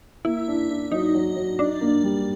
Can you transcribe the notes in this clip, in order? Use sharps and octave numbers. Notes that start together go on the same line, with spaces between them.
A#3 E4
D4
D4
F#3 D#4
F#3
F#3
D4 D#4
A#3
G3